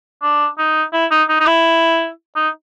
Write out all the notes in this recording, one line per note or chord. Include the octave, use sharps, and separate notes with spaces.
D4
D#4
E4
D#4
D#4
D#4
E4
D#4